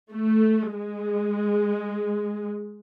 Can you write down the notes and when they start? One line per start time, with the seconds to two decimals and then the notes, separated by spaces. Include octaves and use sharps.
0.13 A3
0.75 G#3